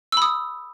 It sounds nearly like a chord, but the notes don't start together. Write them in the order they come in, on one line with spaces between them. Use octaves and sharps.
E6 B5 D#6